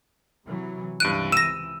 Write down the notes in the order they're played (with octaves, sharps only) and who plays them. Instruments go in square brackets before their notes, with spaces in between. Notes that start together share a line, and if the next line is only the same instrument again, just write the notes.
[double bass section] C3 E3 F#3
[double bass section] C#2 C3 E3 [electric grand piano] G2 D7 D#7 [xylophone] F#6
[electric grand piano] E6 D#7 [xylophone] A#6 E7